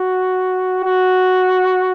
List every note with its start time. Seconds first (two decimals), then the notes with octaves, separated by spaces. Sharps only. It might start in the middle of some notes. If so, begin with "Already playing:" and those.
Already playing: F#4
0.84 F#4